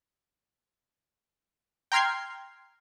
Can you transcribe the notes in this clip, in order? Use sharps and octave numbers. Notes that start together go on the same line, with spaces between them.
G5 A#5 C6 F6 G#6 C7